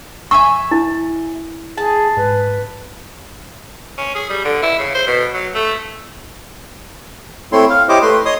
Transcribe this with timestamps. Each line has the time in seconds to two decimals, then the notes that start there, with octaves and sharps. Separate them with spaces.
0.31 G1 E5 G#5 C#6 E6
0.71 E4
1.78 G#4 A5
2.17 G#2 B4
3.98 C#4
4.15 G#4
4.30 G3
4.45 D3
4.62 E4
4.79 C#3
4.94 C5
5.07 B2
5.34 F#3
5.54 A3
7.52 A3 C4 E4 C#5 C6
7.70 F5
7.89 E4 G4 C5 C#5 D#5 D6
8.02 A3 B4 C6
8.25 C#5 D#5 C6 D#6